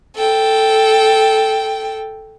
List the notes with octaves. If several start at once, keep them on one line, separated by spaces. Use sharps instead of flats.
A4 G5